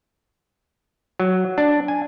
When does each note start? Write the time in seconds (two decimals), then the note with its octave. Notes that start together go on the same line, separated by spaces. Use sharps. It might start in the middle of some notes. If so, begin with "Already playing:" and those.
1.20 F#3
1.58 D4
1.88 G#5